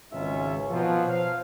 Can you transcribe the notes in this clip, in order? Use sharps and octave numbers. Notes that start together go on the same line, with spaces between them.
G#1 C#2 G#2 C#4 F4 E5
B2 F3 F#3
C5 F5